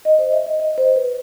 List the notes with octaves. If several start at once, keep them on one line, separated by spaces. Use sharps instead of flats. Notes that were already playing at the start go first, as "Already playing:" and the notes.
D#5
C5
E5
D#5
D#5
C5
B4